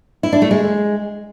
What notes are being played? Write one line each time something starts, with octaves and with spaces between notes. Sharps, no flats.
E4
D4
A3
G#3